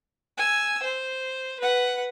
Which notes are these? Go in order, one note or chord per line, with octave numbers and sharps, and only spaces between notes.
G#5 E6
C5
B4 F#5